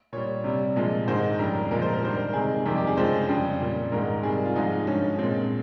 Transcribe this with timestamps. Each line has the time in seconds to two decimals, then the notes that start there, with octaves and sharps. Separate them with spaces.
0.13 A#2 G3 C#5
0.44 C3 G3
0.76 A#2 F3 G#3
1.07 G#2 D#3 G#3 C5
1.39 F2 C#3 G3 A#4
1.71 A#2 F3 G#3 A#4
1.82 C5
1.94 A#4
2.02 G2 D#3 G3 C5
2.16 A#4
2.33 C3 D#3 G#3 G#4
2.65 F2 C3 D#3 G3 G4
2.77 G4
2.87 G#4
2.97 F2 C#3 F3 G#3 C5
3.28 F2 C#3 G3
3.61 A#2 G3
3.92 G#2 D#3 G#3 A#4
4.23 C3 D#3 G3 G#4
4.45 F4
4.55 G#2 F3 G#3 D#4
4.87 G2 F3 G#3 C#4
5.19 A#2 G#3 C4